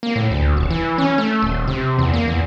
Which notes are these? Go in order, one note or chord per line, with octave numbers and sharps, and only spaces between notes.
A#3
A2
D2
D#1
E3
C#4
A3
D#1
C3
E2
A#3
E2